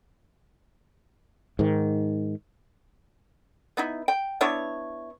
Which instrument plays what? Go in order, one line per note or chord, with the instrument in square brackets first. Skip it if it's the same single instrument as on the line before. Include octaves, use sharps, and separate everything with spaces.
[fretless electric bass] G#2 D#3
[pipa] B3 D#4 E4
G5
B3 D4 E4 C#5